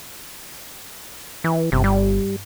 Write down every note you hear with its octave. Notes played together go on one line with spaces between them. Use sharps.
E3
G1 C3
G3